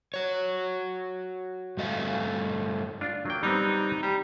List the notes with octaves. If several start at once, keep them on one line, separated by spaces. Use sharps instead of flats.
F#4 C#5
G2 A3 D#5 F5
D4 F4
F#3 A#3 G5
G3 B3 C4 D#4
G3